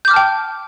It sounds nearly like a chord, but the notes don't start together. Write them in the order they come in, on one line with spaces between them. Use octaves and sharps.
G6 D6 F6 A5 G5